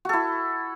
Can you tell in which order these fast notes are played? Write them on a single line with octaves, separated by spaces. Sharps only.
F#4 A4 E4